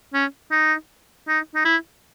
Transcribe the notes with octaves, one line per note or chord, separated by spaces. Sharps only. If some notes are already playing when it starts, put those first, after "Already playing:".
C#4
D#4
D#4
D#4
E4